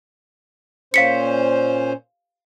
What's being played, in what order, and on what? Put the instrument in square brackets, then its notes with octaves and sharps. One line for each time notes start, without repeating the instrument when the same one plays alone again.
[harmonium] A#2 C#4 C5 [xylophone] F5 B6 C#7